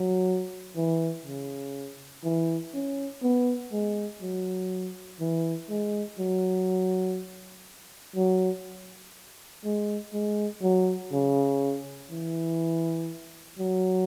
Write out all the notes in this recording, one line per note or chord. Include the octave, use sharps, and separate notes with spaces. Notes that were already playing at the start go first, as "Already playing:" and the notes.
Already playing: F#3
E3
C#3
E3
C#4
B3
G#3
F#3
E3
G#3
F#3
F#3
G#3
G#3
F#3
C#3
E3
F#3